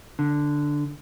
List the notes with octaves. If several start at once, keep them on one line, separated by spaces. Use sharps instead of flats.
D3